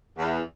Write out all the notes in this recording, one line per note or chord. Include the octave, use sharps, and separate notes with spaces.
E2